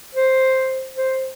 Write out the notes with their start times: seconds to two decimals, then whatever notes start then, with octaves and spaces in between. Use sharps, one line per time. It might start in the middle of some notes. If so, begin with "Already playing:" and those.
0.15 C5
0.97 C5